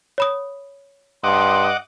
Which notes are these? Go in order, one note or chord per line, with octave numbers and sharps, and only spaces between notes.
C#5 B5 D#6
G2 D#5 F#5 C6 D6